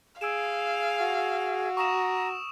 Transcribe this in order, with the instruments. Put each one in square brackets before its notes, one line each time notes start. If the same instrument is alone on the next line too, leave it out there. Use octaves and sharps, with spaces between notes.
[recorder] G#4 [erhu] F5 [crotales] E6 D7 E7
[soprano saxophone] F#4
[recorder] A#5 [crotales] C#6 D#6 E7